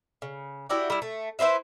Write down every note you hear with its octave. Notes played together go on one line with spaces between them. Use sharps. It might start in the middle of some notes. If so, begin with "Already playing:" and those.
C#3
E4 F#4 G4 D5
G3 E4
A3
E4 B4 C5 E5